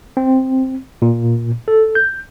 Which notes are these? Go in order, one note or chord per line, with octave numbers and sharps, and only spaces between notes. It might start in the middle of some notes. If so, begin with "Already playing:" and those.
C4
A#2
A4
G6